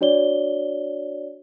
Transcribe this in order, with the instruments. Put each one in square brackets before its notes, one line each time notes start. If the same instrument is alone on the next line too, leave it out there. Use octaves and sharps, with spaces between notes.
[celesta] D4 F#4 C#5 D5 G7